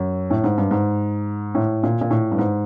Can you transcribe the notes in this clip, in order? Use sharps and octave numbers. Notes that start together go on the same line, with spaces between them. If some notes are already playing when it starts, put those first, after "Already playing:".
Already playing: F#2
A2
G#2
G2
G#2
A2
A#2
A#2
A2
G2
G#2